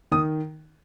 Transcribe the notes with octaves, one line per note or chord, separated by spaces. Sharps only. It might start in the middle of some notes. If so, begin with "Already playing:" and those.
D#3 D#6